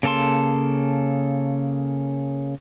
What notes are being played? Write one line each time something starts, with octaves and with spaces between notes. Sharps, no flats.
C#3 A#3 A4 A5 C6